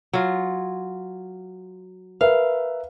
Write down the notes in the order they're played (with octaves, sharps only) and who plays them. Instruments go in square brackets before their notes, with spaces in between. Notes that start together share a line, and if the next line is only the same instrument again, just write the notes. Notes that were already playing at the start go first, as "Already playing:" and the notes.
[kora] F#3 F4
[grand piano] A#4 B4 E5 [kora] F5